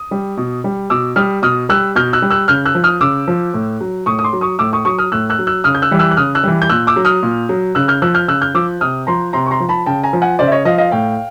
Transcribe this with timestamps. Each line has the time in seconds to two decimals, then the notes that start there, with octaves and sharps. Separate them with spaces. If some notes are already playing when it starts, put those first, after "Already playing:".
Already playing: D#6
0.11 G3
0.37 B2
0.64 G3
0.90 B2 D6 E6
1.16 G3 D#6 F6
1.42 B2 D#6 F6
1.69 G3 E6 F#6
1.95 B2 F6 G6
2.13 E6 F#6
2.22 G3
2.30 E6 F#6
2.48 C#3 F6 G6
2.66 E6 F#6
2.75 F3
2.84 D#6 F6
3.01 C#3 D6 E6
3.28 F3
3.54 A2
3.81 F#3
4.06 A2 C#6 D#6
4.19 D#6
4.24 C6 D6
4.33 F#3
4.41 C#6 D#6
4.59 A2 D6 E6
4.73 C#6 D#6
4.85 F#3 C#6 D#6
4.98 D#6 F6
5.12 A2 E6 F#6
5.30 E6 F#6
5.39 F#3
5.47 E6 F#6
5.64 C#3 D#6 F6
5.75 G6
5.82 E6 F#6
5.91 E3 G3
5.99 E6 F#6
6.11 F#6
6.17 C#3 D#6 F6
6.35 E6 F#6
6.43 E3 G3
6.62 G6
6.70 A#2 E6 F#6
6.87 D6 E6
6.96 F#3
7.05 D#6 F6
7.23 A#2
7.49 F#3
7.75 C#3 E6 F#6
7.88 F6 G6
8.02 F3 E6 F#6
8.15 F6 G6
8.28 C#3 E6 F#6
8.42 F6 G6
8.54 F3 D6 E6
8.81 C3 D#6 F6
9.07 F3 A#5 C6
9.33 C3 A#5 C6
9.46 C#6
9.51 A#5 C6
9.60 F3
9.69 A5 B5
9.86 C#3 G5 A5
10.03 G#5 A#5
10.13 F3
10.22 F#5 G#5
10.39 C#3 C5 D5
10.48 E5
10.52 C#5 D#5
10.65 F3 D#5 F5
10.78 D#5 F5
10.91 A2 F5 G5